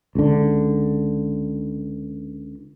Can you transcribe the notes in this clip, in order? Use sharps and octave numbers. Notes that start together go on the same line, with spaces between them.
C#2 D3